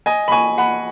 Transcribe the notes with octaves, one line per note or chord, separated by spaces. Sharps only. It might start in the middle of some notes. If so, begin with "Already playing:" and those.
D#5 G#5
B5
G#5 C#6
F#5 B5